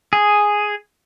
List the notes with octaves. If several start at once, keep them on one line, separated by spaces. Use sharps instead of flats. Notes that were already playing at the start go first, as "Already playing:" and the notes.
G#4